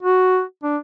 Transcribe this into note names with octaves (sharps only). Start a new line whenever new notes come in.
F#4
D4